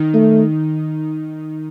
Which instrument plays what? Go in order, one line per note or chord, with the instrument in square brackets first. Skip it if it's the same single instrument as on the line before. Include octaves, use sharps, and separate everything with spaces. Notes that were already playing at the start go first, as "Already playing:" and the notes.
Already playing: [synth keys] D#3 D#4
[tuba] A3